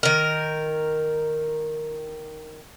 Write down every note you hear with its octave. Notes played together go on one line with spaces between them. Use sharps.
D#3 A#4